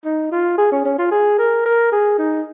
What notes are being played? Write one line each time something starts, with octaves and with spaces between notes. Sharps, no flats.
D#4
F4
G#4
C#4
C#4
F4
G#4
A#4
A#4
G#4
D#4